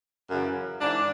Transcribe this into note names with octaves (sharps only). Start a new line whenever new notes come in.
F#2 C#3 E3
G#2 E3 D4